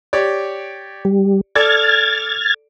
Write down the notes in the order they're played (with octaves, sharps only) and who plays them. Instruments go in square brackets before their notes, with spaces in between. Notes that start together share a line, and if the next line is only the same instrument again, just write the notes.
[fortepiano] G4 C#5 D5
[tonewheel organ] G3
[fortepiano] A4 D5 [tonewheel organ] F6 G#6 A6